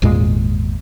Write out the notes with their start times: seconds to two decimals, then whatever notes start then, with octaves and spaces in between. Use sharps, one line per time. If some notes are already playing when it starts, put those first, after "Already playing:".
0.02 G#1 E2 A#2 G#3